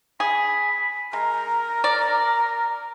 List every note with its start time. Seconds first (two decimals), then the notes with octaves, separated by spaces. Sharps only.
0.20 G#4 B5
1.13 G#3 A#4 A#5
1.84 D5